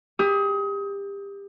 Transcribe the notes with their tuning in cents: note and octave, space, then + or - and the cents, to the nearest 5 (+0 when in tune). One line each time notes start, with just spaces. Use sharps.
G4 +30 D#6 +30